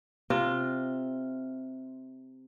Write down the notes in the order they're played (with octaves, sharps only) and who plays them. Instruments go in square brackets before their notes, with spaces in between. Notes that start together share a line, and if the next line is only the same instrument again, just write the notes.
[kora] C3 F4